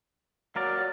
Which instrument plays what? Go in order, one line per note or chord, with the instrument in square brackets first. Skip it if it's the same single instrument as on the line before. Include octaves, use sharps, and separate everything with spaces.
[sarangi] F#3 [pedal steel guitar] A#3 A#4 D5